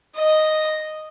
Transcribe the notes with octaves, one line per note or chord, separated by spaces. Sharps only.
D#5